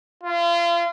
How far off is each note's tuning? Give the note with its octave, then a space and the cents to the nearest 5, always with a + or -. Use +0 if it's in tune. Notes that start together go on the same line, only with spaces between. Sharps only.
F4 -35